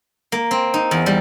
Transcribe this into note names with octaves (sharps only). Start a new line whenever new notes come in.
A#3
C4
D#4
E2
G3